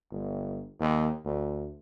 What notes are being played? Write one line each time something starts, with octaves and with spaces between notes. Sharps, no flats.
G1
D#2
D2